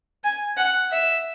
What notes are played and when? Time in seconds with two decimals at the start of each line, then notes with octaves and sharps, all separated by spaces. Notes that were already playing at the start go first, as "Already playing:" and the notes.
0.24 G#5
0.57 F#5
0.92 E5